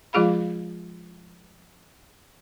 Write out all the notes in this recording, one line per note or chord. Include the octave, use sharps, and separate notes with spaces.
F3 G#3 F4 G#4 F5 B5